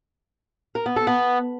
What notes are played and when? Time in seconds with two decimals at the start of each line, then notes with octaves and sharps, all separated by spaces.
0.75 A#4
0.86 B3
0.96 A4
1.07 B3